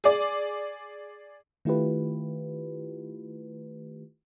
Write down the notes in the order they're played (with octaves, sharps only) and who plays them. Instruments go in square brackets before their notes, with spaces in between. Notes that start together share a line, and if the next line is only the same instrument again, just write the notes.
[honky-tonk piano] G#4 D5
[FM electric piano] D#3 A3 E4 F4 G4 B4